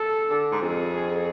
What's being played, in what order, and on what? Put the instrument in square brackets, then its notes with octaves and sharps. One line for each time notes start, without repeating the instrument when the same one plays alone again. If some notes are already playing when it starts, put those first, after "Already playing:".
Already playing: [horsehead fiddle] A4
[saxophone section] D3
G#2
[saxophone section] F2 [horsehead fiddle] G#4